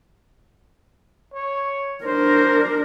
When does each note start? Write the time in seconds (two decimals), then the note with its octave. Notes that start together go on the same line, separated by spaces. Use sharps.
1.34 C#5
2.05 D4 A#4 C5